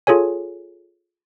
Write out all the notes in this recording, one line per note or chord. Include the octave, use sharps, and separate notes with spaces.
F4 G#4 A4 C#5 G#5